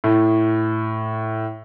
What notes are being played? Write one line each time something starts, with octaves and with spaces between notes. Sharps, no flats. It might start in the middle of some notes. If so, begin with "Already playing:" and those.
A2